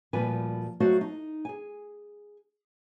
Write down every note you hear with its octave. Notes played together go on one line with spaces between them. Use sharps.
D2 A#2 F3 G3 B4 G#5
F#3 A3 F#4 C5 D#5 F5
D#4
G#4 G#5